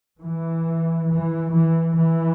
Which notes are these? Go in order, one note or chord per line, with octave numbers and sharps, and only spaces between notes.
E3
E3
E3
E3